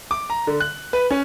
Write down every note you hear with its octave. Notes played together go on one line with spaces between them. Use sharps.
D6
A#5
D3
F#6
B4
C#4